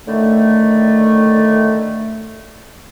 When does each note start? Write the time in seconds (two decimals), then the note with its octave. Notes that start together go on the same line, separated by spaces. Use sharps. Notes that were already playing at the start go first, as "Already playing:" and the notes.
0.08 A2 D3 D#3 A3